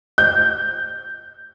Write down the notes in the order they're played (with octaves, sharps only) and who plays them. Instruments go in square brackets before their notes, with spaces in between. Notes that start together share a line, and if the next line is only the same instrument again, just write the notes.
[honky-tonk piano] G6